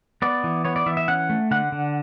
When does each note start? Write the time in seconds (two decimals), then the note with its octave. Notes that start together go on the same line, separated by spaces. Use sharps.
0.22 B3 D5
0.44 E3
0.65 B3 C#5
0.76 D5
0.86 E3 E5
0.97 E5
1.08 C#4 F#5
1.30 A3
1.51 D3 F#5
1.72 D3